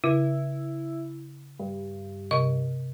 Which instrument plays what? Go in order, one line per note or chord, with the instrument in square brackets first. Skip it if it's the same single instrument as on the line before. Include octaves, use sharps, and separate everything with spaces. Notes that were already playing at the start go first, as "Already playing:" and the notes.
[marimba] C#3 [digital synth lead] E4
[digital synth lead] G2
[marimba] C3 D#5